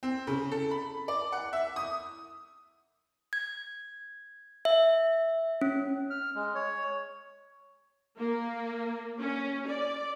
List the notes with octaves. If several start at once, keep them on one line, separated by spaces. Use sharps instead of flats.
C4
C#3
A4
B5
D5
F#5
E5
D#6
G#6
E5
C#4
F6
G#3
C#5
A#3
C#4
D5